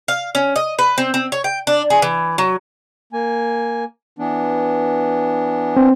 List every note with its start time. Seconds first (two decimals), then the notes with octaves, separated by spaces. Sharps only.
0.08 F5
0.35 C#4
0.56 D#5
0.79 B4
0.98 C4
1.14 C4
1.32 C#5
1.44 G5
1.67 D4
1.90 G#4
2.02 E3
2.38 F#3
3.13 A#3 G#5
4.19 E3 B3 D4
5.77 C4